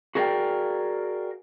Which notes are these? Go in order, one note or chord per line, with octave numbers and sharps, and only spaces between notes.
F#4 G#4 A#4 D5 F5 G5